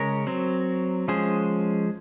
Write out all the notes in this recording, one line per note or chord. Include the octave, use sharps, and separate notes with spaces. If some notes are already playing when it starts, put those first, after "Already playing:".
Already playing: C#3 G#3 C#4 A#4 C#5
F#3 C4
F3 G#3 C#4 G#4 C5